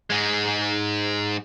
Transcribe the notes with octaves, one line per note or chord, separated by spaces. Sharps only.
G#2 G#3